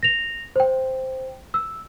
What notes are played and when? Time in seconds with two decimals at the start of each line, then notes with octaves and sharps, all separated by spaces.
0.03 A#6 F7
0.56 C5 G5
1.54 E6